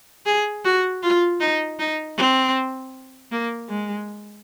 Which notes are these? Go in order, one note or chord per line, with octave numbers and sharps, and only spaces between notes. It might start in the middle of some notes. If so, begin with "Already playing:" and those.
G#4
F#4
F4
D#4
D#4
C4
A#3
G#3